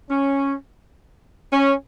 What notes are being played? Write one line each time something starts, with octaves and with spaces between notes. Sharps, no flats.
C#4
C#4